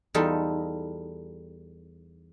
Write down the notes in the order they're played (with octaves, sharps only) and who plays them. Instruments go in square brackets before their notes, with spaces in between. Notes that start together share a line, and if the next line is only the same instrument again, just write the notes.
[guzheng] E2 G3 D#4 F4 A4